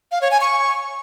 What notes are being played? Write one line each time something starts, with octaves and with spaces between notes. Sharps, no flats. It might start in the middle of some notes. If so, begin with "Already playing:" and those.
F5
C#5
G#5
C#6